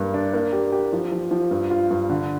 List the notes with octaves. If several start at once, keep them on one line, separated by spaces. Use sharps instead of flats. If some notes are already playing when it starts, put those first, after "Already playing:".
Already playing: G2 G3 A#3
D4
A#3
G4
G4
F3
F3
F3
G2
F4
G2
D3